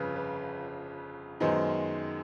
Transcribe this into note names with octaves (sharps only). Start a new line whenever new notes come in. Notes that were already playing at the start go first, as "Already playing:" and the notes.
Already playing: G1 F2 C#3 B4
B4
F#2 D#3 G#3 B3 C5